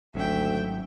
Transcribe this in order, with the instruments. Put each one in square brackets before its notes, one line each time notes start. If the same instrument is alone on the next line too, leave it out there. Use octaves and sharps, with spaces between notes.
[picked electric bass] G#1 F#3 C#4 [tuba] D2 [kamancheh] E5 G5